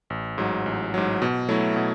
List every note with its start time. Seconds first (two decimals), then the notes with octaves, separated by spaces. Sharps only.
0.10 A1
0.38 G#2 F#3
0.66 A1
0.94 G#2 F#3
1.22 B2
1.49 F#3 A3 E4
1.76 B2